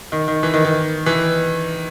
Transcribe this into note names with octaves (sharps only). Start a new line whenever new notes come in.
D#3
D#3
E3
D#3
D#3
E3